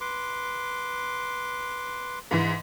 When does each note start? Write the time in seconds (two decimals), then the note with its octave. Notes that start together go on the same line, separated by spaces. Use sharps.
0.01 B4 C6 D6
2.31 G#2 E3